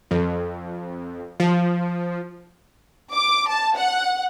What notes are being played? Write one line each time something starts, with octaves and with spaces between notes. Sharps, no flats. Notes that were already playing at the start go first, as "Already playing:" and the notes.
F2
F3
D6
A5
F#5